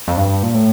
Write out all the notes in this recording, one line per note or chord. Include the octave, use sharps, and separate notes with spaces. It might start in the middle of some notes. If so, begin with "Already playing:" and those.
F2
G2
A#2
A2